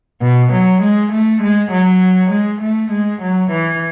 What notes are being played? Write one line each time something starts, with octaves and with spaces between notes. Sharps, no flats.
B2
F#3
G#3
A3
G#3
F#3
G#3
A3
G#3
F#3
E3